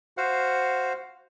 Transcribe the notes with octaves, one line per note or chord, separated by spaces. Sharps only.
F#4 C5 F5 F#5